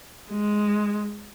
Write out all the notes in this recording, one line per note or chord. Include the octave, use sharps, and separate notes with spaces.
G#3